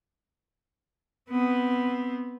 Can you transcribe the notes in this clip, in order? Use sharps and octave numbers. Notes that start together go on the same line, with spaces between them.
B3 C4